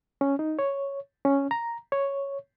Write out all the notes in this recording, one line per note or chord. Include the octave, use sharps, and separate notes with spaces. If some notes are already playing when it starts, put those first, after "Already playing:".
C#4
D#4
C#5
C#4
A#5
C#5